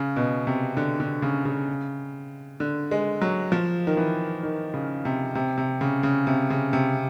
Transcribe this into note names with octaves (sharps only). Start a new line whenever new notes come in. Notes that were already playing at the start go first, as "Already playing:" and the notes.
Already playing: C#3
B2
C3
D3
D3
C#3
C#3
D3
G#3
F#3
F3
D#3
E3
D#3
C#3
C3
C3
C3
C#3
C#3
C3
C#3
C3